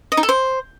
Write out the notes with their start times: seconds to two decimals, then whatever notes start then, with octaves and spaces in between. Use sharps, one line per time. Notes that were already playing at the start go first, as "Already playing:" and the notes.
0.12 D#5
0.17 D#4
0.23 A4
0.29 C5